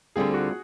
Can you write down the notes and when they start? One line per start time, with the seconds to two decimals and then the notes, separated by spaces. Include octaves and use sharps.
0.16 D2 D3 G3 C4 F4 G#4
0.33 F#4